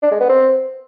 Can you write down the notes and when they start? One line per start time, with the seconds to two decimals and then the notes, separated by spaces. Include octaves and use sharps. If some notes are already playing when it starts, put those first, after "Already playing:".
0.02 D4
0.11 G#3
0.20 B3
0.29 C4